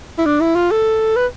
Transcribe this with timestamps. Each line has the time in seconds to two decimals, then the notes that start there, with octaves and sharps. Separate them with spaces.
0.18 E4
0.26 D4
0.41 E4
0.56 F4
0.71 A4
1.16 B4